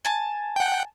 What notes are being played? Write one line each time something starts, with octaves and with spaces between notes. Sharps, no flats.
G#5 A5
F#5 G5